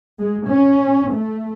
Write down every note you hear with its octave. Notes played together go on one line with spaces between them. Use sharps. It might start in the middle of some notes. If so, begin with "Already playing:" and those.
G#3
C#4
A3